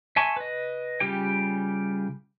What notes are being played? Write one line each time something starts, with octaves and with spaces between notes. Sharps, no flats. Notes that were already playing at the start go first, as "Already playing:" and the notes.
E5 G#5 A5 C6 C#6
B4 D#5
C#3 G3 F4 G4 G5